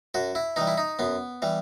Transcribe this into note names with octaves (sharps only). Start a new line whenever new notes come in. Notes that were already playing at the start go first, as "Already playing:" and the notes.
F#2 F#4
E4
E3 G3 D#4
E4
D#4
F#2 B3
E3 G3